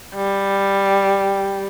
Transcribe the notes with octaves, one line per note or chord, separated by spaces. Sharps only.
G3